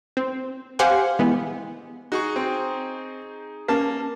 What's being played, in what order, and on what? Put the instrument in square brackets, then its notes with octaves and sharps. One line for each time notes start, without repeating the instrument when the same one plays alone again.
[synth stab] C4
G4 C5 F5 F#5 G#5
E3 G#3 B3
[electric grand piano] D#4 G#4 C#6 [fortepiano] F#4
[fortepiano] C4
[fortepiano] A#3 A5 [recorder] C#4